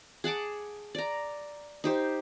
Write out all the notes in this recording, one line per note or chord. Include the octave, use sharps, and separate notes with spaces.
G#4 F#5 A5 D6
D5 A#5
D#4 G4 C5